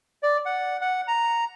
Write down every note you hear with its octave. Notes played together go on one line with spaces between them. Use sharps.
D5
F#5
F#5
A#5